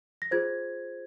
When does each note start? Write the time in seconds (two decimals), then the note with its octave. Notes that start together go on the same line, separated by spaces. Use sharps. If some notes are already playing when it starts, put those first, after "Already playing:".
0.22 A#6
0.31 F4 G#4 C5 G#6